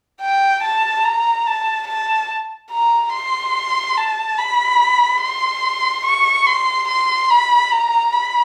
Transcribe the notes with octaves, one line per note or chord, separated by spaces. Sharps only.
G5
A5
A#5
A5
A5
A#5
C6
A5
B5
C6
C#6
C6
C6
B5
A#5
B5